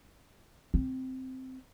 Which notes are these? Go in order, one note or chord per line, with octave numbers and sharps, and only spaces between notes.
C4